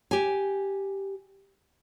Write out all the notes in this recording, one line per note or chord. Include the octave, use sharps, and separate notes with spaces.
G4 G#5